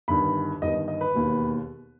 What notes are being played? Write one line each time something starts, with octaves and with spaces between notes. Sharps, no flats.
G1 G2 D#3 B5
G1 G2 D#3 D#5
D#5
B4
E1 D#2 D#3